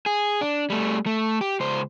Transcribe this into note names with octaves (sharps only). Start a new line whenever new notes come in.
G#4
D4
G3 A3
A3
G4
C#2 C5